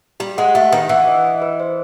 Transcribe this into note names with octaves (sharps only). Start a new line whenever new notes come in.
G3 G4
G#3 F#5
A3 G4
D#3 B4
E3 F#5
D#5
D#5
B4
C5